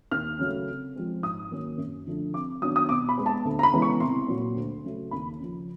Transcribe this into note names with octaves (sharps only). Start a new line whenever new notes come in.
D#2 F6
C#3 F#3 A3
C3
F3 G#3 C4
G#2 D#6
D#3 F#3 A#3 C#4
F#2
D3 F3 A3 D4
C3 D6
D#3 F#3 B3 D4 D#6
D#6
B2 D6
B5
G#3 B3
A5
D2
A#5
B5
C#3 E3 G#3 B3
C#6
C2 C6
A#2 F#3
D2
C#3 F#3 A3
D#2 B5
C#3 F3